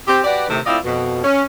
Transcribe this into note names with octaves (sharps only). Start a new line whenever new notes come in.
C4 G4
F#4 G4 B4 D5
A2 C3 D#3
A3 C4 E4 F4 D5 D#5
F2 B2
C#4